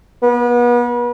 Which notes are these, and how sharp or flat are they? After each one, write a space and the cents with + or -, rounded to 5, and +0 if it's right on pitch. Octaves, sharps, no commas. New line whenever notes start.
B3 -35